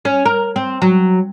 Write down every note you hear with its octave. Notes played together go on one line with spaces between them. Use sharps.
C#4
A#4
C4
F#3